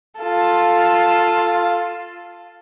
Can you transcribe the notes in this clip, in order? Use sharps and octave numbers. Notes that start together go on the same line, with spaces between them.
F4 A4